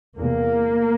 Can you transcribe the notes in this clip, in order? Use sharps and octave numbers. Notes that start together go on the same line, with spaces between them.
E2 C3 A#3